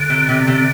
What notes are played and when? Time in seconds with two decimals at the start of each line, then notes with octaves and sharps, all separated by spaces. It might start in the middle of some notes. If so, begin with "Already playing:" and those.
Already playing: D3
0.10 C3
0.29 C3
0.47 C3